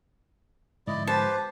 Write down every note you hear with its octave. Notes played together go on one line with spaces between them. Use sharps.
G#2 D3 F3 E4 D5 D#5
G4 B4 C5 A5